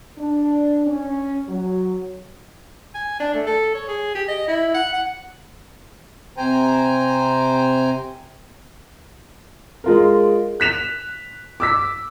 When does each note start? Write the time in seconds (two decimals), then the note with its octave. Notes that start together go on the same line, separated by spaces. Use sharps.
0.18 D4
0.87 C#4
1.48 F#3
2.94 G#5
3.20 D4
3.34 A3
3.46 A4
3.74 C#5
3.88 G#4
4.15 G4
4.28 D#5
4.48 E4
4.74 F#5
4.93 F#5
6.37 C3 C5 G5 G#5 A#5
9.84 G#3 F4 A#4
10.60 F#6 B6 E7 F7
11.60 D6 E6 B6